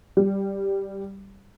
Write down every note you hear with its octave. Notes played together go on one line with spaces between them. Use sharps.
G3